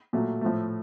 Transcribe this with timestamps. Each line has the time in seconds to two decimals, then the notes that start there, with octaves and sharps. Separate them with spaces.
0.13 A#2 F#3 A3
0.41 A2 F3 A3